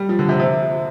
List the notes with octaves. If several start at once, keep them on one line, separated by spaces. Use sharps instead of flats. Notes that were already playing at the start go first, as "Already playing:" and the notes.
Already playing: G3
F3
D3
C3
C3